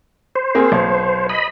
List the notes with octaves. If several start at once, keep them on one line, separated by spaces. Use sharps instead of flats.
C5
A#3 C4 G#4
B1
D#5 B5